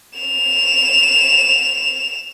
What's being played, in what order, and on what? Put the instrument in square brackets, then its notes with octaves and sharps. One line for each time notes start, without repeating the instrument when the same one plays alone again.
[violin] E7 F7